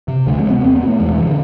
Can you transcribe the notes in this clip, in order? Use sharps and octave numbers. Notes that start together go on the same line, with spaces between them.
C3
D2 A3
G#3
C3
B3
E2 C4
B3
B2
A3
E2 G#3
B2 E3
D3